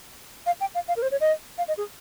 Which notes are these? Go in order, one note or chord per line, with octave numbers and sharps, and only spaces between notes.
F5
G5
F5
F5
A#4
C5
C#5
D#5
F5
D#5
G#4